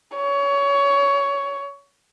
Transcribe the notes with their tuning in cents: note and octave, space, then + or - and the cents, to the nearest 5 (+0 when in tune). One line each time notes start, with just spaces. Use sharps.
C#5 +20